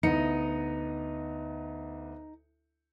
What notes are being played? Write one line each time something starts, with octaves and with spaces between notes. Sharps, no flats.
D2 B3 D#4 C#7